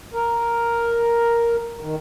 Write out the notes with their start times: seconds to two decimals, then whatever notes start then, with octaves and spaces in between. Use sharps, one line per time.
0.14 A#4
1.81 D#3